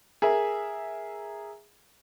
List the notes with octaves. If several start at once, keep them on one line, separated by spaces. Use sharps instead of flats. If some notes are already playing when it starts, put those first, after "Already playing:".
G#4 A#4 E5